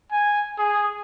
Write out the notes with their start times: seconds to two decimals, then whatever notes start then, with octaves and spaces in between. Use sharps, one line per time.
0.11 G#5
0.58 G#4